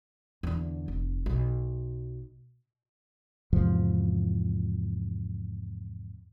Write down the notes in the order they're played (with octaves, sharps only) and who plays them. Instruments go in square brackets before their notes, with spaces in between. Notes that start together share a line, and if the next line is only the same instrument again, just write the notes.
[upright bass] E2 D3
F1
B1
[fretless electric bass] E2 G#2 C3 F3